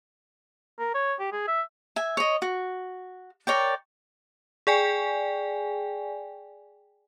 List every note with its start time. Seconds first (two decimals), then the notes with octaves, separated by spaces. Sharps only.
0.79 A#4
0.94 C#5
1.20 G4
1.32 G#4
1.48 E5
1.96 E5 G#5
2.17 C#5 D#5
2.42 F#4
3.47 A#4 C#5 D5 G5
4.67 G#4 D5 G5 G#5